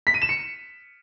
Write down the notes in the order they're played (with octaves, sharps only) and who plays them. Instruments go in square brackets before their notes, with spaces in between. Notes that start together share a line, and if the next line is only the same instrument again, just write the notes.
[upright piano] B6
D#7
E7
C#7